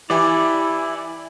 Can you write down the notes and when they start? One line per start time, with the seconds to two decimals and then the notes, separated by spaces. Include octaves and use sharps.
0.10 E3 E4 G4 D5 G#5